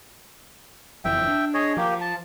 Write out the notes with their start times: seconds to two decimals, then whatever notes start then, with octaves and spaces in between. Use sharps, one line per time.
1.05 F#1 F2 E3 E5 G5
1.27 D4
1.54 G#4 C#5 D#5
1.77 F3 A#3 G4
2.01 A5